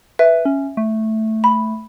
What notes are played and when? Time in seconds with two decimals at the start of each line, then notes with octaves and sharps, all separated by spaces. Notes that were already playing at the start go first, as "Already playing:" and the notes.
0.19 B4 E5
0.45 C#4
0.77 A3
1.44 B5